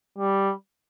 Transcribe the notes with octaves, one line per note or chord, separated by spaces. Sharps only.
G3